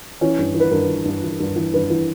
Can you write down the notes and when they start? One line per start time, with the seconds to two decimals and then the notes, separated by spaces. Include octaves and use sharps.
0.21 E3 C#4
0.39 G2
0.55 E3
0.60 B4
0.71 G2 A#4
0.89 E3
1.05 G2
1.23 E3
1.40 G2
1.56 E3
1.73 G2 B4
1.90 E3